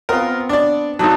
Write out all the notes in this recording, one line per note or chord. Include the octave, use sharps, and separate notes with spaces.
B3 C4 F4 A#4
D4 D5
B1 F#3 D4 D#4 A4